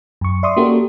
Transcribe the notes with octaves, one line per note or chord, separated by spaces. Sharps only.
F#2 C#6
D5 E5 C6 C#6 D#6
A#3 C#4 F#4 G4 A4 A#4